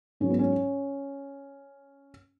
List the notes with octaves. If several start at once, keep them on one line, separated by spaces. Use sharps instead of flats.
G#2 F#3 C#4
B3
C#4